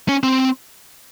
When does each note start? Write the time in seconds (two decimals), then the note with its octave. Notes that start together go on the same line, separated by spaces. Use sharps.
0.09 C#4
0.23 C4